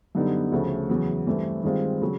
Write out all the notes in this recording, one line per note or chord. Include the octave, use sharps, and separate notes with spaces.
F#2 D3 G3 B3 D#4
D2 C#3 F3 A3
E2 C#3 F#3
G2 E3 A3 C4
G2 D#3 G#3 C4 F4
C#3 F#3